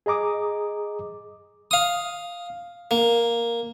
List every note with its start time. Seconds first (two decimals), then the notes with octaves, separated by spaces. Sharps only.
0.06 G#4 D#5 A#5 D6 D#6
1.71 F5 D#6
2.91 A#3